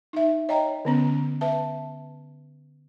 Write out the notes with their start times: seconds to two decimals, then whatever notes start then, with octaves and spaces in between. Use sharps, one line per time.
0.13 D#4 E5
0.49 C#5 D#5 G5 A#5
0.85 D3 B3 C#4
1.41 B4 E5 A5